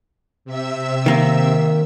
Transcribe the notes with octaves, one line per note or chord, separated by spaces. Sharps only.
C3 E5 E6
D#3 A#3